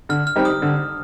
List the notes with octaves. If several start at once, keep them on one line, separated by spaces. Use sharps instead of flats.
D3 F6
F6
G3 C4 D#4 G4
D#6
D3